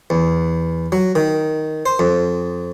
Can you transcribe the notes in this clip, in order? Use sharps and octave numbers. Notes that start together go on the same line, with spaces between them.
E2
F#3
D#3
C5
F2